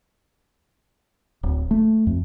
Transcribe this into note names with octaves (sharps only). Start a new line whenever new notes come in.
D1
A3
F2